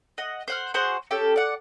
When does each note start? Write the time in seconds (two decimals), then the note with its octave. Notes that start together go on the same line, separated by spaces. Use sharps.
0.18 D#5 F#5
0.48 C5 F#5 F6
0.74 F#4 G#4 C5 F#5
1.11 C#4 G4 A4
1.36 D5 F#5